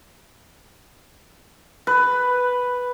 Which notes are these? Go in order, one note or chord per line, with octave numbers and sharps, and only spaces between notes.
B4